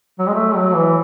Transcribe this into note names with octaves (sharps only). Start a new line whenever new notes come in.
F#3
G#3
A3
F#3
E3